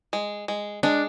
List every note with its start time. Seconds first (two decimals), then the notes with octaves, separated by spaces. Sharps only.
0.13 G#3
0.48 G#3
0.83 G#3 D4